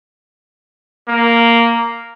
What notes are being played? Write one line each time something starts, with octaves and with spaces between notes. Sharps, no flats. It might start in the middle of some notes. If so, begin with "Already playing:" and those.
A#3